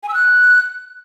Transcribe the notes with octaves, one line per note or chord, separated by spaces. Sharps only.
G#5
E6
F#6